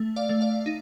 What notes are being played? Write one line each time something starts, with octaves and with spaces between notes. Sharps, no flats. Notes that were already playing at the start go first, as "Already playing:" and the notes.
Already playing: A3
D5 F5
A3
D5 F5
D#4